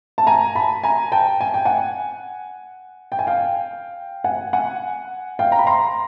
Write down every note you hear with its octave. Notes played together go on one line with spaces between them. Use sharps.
A5
G#5 A#5
A5 B5
G#5 A#5
G5 A5
G#5
G5
F#5 G#5
G5
G#5
F5 G5
F#5 G#5
F#5 G#5
F5 G5
A#5
B5
A#5 C6